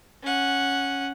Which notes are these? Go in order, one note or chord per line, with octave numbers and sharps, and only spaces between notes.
C#4 F#5